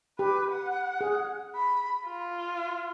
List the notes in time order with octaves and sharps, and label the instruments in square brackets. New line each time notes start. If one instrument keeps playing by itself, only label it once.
[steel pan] G4 [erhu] B4
[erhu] F#5
[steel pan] G#4
[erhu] B5
F4